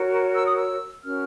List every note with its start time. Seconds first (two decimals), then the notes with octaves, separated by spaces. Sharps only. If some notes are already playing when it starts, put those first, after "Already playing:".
Already playing: F#4 A#4 C#5
0.34 E6
0.45 D#6
0.56 E6
1.04 C#4 F#4 A#4 F6